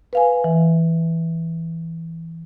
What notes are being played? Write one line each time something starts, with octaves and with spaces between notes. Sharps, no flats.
B4 F5 G#5
E3